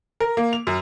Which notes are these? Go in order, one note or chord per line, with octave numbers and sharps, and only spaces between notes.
A#4
A#3
F7
F#2